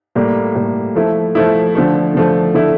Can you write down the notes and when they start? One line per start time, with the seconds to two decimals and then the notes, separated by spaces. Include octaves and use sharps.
0.15 A2 G3 A#3
0.55 A2 G3 A#3
0.95 F3 A3 E4
1.35 F3 A3 E4
1.75 D3 F3 A3
2.15 D3 F3 A3
2.54 D3 A3 E4